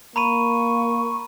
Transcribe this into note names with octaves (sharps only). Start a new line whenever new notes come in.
A#3 A#5 B5 C#6 D#7